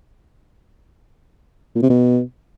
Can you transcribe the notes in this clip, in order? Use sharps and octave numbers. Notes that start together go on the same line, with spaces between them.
A#2
C3
B2